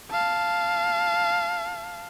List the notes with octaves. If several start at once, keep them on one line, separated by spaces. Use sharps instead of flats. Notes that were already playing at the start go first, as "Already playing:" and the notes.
F5 A5